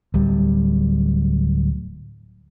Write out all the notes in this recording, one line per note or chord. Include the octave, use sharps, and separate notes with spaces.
D1 G3